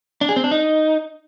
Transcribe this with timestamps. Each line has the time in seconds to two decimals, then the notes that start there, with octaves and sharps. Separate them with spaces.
0.21 D4
0.29 G#4
0.36 C4
0.44 D4
0.51 D#4